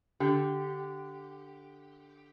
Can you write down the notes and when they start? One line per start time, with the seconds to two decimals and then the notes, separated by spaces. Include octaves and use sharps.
0.20 D3 G4